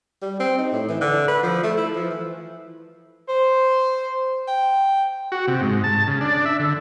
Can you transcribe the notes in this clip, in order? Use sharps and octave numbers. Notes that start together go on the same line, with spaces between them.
G3
C4
D#4
A2
E3
D3
B4
F3
A3
E4
F3
E3
C5
G5
F#4
C3
G#2
A5
C#3
D4
E5
D3